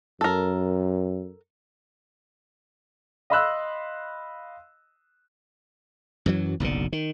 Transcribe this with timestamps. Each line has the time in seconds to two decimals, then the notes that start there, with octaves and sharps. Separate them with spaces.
0.21 F#2 A4 A#4
3.30 D#5 F5 B5 C6 E6 F#6
6.26 F#2 E3 F#3
6.60 F#1 B1 A#2 D3
6.93 D#3